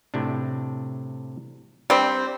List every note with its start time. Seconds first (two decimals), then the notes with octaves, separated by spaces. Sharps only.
0.14 A2 C3 D4
1.90 G3 C4 D4